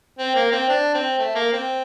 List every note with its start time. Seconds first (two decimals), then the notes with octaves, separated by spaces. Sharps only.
0.19 C4
0.35 A#3
0.52 C4
0.69 D4
0.94 C4
1.19 A3
1.35 A#3
1.53 C4